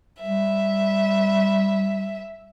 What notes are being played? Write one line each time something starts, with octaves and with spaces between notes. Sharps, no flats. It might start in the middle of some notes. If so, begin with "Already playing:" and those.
G3 E5